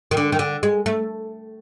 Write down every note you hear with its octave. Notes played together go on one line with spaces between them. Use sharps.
D#3
D3
D#3
D3
G#3
A3